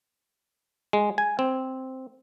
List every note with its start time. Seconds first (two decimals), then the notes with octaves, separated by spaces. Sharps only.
0.93 G#3
1.18 G#5
1.39 C4